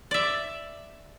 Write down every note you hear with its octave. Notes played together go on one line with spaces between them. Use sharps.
D5 E5